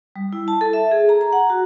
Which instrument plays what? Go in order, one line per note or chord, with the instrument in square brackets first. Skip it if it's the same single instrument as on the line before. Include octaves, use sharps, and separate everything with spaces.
[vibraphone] G3
E4
A5
A4
E5
G#4
A#5
A#5
F#5
F#4